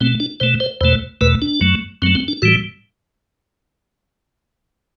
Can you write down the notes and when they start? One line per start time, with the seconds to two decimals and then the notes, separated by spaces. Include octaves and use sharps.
0.01 B2 A3 C4
0.20 D4
0.40 B2 A3 C5
0.60 C5
0.81 E2 B2 A3 C5
1.21 E2 B2 A3 B4
1.42 D4
1.61 F#2 F#3 A3
2.02 F#2 F#3 A3 C4
2.15 C4
2.28 D4
2.42 A2 E3 G3 F#4